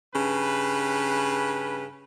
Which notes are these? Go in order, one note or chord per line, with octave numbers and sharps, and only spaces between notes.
G2 C#3 B4